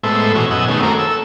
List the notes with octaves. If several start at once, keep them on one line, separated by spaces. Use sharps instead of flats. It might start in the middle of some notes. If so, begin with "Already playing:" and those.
A2 G#3 B3 A4 C5 E5
B2 E3 C#4 F#4 G#4
F#2 B2 D#5 F#5 G#5 E6
D#3 A3 B3 C#4 G#4
A3 A#3 C4 F#4 G#4 A#4
A4 E6